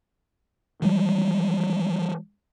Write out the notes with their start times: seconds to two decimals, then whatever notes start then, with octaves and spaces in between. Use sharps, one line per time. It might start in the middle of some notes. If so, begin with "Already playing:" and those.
0.82 E3 F3 G3 G#3